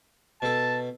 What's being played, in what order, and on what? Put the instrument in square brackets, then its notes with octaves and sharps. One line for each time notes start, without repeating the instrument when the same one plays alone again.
[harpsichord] B2 A4 [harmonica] A5